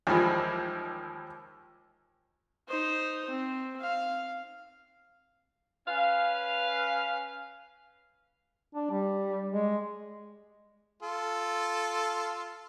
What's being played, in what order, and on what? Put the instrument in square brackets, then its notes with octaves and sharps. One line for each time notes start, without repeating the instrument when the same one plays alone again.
[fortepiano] D#2 E3 F3 G3 G#3
[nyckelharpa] D#4 C5
C4
F5
[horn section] C#4 B4 F5
[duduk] D4
G3
G#3
[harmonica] F4 A4